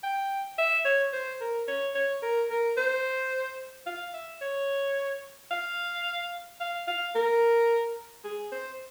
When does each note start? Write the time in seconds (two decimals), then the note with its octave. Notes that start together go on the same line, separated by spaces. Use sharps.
0.03 G5
0.58 E5
0.85 C#5
1.13 C5
1.40 A#4
1.68 C#5
1.95 C#5
2.23 A#4
2.50 A#4
2.77 C5
3.87 F5
4.14 E5
4.41 C#5
5.51 F5
6.60 F5
6.87 F5
7.15 A#4
8.24 G#4
8.52 C5